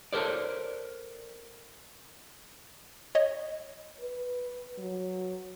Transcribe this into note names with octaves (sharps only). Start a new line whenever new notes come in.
A4 A#4 C5 D5
C#5 D#5
B4
F#3